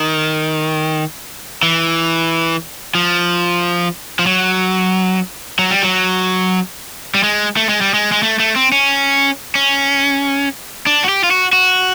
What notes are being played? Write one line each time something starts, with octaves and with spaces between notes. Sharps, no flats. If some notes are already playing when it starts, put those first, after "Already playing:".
Already playing: D#3
E3
F3
F3
F#3
F#3
G3
F#3
G3
G#3
A3
G#3
G3
G#3
G#3
A3
A3
C4
C#4
C#4
D4
F#4
G4
F4
F#4
F#4